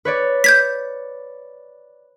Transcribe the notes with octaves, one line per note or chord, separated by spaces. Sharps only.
B4 C#5 D5
G6 G#6 B6